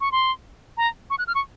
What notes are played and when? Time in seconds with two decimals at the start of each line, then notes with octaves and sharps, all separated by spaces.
0.01 C#6
0.12 C6
0.77 A#5
1.10 C#6
1.19 F#6
1.27 F6
1.35 C#6